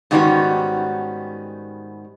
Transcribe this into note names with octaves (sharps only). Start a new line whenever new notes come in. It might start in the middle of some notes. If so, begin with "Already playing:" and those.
G#2 D#3 G3 B3 C#4 F#4